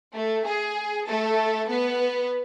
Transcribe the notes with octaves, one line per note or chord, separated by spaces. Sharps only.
A3
G#4
A3 A4
B3 B4